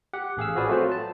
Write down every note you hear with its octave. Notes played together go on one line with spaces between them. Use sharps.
G4 F#5
A1 G#4 F5 E6
F3 F#4 G#4 B4 D5
F#3 A3 C4 F4 C5
A5